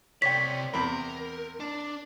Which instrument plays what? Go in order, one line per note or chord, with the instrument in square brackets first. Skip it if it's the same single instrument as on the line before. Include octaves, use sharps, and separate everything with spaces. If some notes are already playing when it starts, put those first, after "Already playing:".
[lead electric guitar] C3 D5 [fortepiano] C#5 G5 [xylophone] B6
[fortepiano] E2 C4 B5 [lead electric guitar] A#4
[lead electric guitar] D4